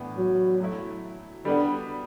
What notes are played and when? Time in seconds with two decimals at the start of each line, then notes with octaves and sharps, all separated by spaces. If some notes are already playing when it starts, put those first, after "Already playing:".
Already playing: A2 E3 B3 D4
0.17 F#3
0.60 F#3 A3 E4
1.45 D3 G3 B3 D4